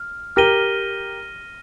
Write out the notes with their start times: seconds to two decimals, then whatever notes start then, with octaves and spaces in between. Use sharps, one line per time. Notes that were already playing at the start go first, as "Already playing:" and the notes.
Already playing: F6
0.36 G4 A#4 F6 A#6 D#7 G7